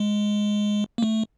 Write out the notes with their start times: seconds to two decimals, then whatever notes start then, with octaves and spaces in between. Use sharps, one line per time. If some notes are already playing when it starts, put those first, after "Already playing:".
Already playing: G#3
0.98 A#3
1.03 A3